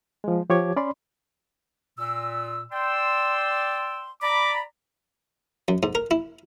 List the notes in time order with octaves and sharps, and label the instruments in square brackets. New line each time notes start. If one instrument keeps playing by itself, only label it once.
[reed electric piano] F3 G#3
F3 G4 C#5 D6 G#6
C#4 D5 B5 C6
[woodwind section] A#2 E6
[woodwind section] D5 G5 C6 [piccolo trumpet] E6
[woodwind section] D5 A#5 B5 [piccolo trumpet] D6
[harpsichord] F#2
G#2
A#4
E4